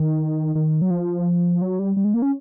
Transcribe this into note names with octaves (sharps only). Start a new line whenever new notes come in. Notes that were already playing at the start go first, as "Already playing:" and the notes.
Already playing: D#3
D#3
F#3
F3
F#3
G3
G3
G#3
A#3
C#4